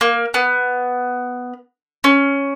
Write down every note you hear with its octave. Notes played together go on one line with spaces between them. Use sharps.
A#3
B3
C#4